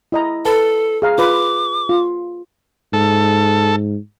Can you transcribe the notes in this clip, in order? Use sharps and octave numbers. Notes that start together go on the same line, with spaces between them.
E4 D#5 A#5
A4 B4 A5
G#4 F5 A#5
F4 B4 D6
F4
G#2 A4